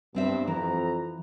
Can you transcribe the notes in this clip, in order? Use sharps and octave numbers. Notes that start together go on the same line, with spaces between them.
G2 B3 C4 E5
F2 E3 A#5